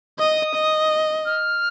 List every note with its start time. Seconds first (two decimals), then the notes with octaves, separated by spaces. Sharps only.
0.18 D#5 D#6
0.55 D#5
1.25 F6